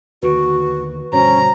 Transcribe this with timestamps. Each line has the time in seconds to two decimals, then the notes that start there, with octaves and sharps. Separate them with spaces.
0.23 D#2 D3 F#4 B4
1.13 G2 B2 D3 C#4 F#4 C5 C#5 A#5